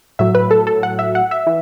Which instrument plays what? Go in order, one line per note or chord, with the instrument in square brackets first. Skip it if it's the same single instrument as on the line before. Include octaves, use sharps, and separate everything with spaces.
[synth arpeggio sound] A2 F#3 E5
B4
A4
A4
F#5
E5
F#5
E5
E3